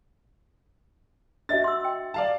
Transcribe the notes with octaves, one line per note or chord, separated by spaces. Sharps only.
D4 F#4 D#5 E5 A6
C6 E6
G5
D5 F5 A5